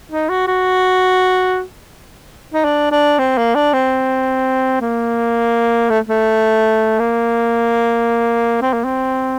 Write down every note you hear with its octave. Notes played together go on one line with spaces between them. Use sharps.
D#4
F#4
F#4
D#4
D4
D4
C4
A#3
D4
C4
A#3
A3
A3
A#3
C4
A#3
C4